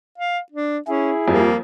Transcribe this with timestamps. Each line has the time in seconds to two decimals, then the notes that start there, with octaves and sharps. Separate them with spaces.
0.18 F5
0.52 D4
0.88 C#4 E4 G#4
1.28 F2 G3 A#3